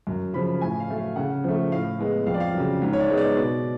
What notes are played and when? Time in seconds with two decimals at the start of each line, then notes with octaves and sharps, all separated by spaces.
0.07 F#2
0.33 C#3 F3 B5
0.61 A2 G#5
0.80 F5
0.89 F#3 A3
0.98 F5
1.16 C#3 F#5
1.44 F3 A3
1.72 A2 F5
1.99 G#3 B3
2.26 F2 F5
2.34 D5
2.40 F5
2.54 C#3 F#3
2.82 G#2
2.93 C#5
3.00 D5
3.09 G#3 B3
3.17 D5
3.36 B2